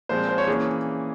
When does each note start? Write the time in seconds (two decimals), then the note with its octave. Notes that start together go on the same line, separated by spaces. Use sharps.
0.09 A#2 F3 G#3 C4 C5
0.29 C5
0.38 C#5
0.47 E3 A#3 C#4 G#4